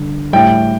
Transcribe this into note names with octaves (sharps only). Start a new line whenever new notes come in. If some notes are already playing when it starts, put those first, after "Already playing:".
Already playing: G2 D3
A2 G3 G5